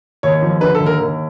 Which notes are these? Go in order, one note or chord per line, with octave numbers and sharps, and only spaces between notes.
D#2 C#5
F3
D3 B4
A4
D#2
A#4
D#2